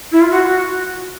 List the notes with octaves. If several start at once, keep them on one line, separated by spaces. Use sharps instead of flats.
E4
F4
F#4